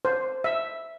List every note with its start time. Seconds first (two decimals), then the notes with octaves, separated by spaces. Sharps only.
0.05 C5
0.44 E5